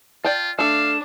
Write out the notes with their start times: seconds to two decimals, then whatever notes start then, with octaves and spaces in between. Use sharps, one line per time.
0.25 F4 D5 G5 A5
0.59 A3 D4 A4 F5 E7